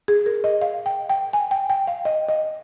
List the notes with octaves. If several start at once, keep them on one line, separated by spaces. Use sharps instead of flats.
G#4
A#4
D#5
F5
G5
G5
G#5
G5
G5
F5
D#5
D#5